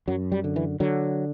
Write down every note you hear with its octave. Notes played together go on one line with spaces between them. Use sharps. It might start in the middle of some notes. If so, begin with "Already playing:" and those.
F#2 F#3
G3
D3
E3
D3 F#3